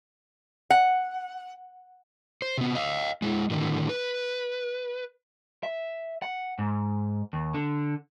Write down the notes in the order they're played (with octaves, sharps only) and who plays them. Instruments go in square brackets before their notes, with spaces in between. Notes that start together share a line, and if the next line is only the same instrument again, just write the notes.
[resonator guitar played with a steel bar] F#5
[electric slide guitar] C5
C3 B3
D#5 F5
G#3 E4
A2 D3 D#3
B4
[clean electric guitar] E5
F#5
G#2
D#2
D3